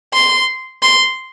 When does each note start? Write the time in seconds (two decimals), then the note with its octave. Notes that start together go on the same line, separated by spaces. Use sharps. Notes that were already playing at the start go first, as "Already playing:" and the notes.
0.14 C6
0.82 C6